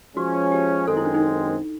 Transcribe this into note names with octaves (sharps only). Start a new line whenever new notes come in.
F3 G#3 C#4 F#4
G4
F#2 D#3 G#3 C4 A4
E4
D4
D#4